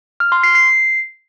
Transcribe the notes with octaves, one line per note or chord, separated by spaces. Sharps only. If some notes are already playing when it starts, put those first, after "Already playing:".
F6
C6
C7
C7